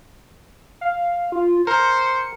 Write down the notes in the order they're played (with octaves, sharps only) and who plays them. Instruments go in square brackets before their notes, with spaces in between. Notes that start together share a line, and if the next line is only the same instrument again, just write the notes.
[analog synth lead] F5
F4
[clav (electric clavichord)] A#4 [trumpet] C5 [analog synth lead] C#7